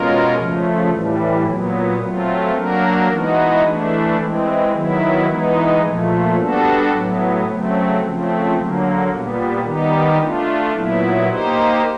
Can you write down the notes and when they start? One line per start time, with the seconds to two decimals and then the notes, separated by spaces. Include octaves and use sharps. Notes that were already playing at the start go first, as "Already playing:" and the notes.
Already playing: B2 G#3 C#4 F4 A#4
0.35 C#3 F3 A3
0.89 A2 E3 G3
1.44 A#2 F#3 B3
1.98 F#3 A3 C4 F4
2.53 F#3 A#3 D4 F#4 A#4
3.08 E3 G#3 B3 D#4 F#4
3.63 E3 A3 D4
4.17 E3 G#3 C4
4.71 D#3 F#3 B3 E4
5.26 E3 G#3 B3 D#4
5.80 A#2 F3 A3
6.35 G3 B3 D4 F#4 A4
6.90 A2 F#3 B3
7.45 C#3 F#3 A3 C4
7.99 C#3 F3 A3 C4
8.53 D3 F#3 A#3
9.08 A#2 G3 B3
9.63 D#3 G3 B3 D#4 G4
10.18 A3 D4 F4
10.73 A#2 F#3 B3 E4
11.27 A#3 D#4 G4 C5